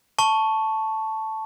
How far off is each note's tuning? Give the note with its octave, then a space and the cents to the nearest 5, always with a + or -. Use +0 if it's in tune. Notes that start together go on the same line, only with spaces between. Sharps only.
A5 +0 C#6 +0